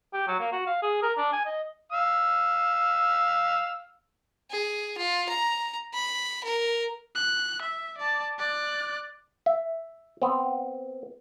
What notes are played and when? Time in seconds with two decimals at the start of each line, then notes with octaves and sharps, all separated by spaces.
0.13 G4
0.27 F#3
0.40 A#3
0.52 F#4
0.67 F5
0.83 G#4
1.03 A#4
1.18 D4
1.32 G#5
1.46 D#5
1.92 F5 E6
4.51 G#4
4.98 F4
5.29 A#5
5.94 B5
6.44 A#4
7.15 F#6
7.62 E5
7.98 D5 A5
8.39 D5 F#6
9.46 E5
10.22 B3 C4